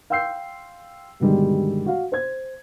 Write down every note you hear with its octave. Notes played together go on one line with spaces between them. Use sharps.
F5 G5 C6 E6 G6 C7
G2 B2 D3 D#3 G3 G#3
F#4 F5
C5 G#6